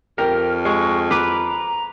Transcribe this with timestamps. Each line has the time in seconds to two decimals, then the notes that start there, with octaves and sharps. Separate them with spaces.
0.18 F2 G4 A#4 F6
0.65 G#3 C#6
1.11 B4 A#5 D6